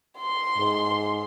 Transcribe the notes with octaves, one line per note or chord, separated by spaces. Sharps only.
C6
G#2